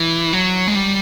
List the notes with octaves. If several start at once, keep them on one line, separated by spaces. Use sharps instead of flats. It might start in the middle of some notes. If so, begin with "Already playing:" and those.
Already playing: E3
F#3
G#3
G3